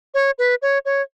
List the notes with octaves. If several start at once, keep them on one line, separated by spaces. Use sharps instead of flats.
C#5
B4
C#5
C#5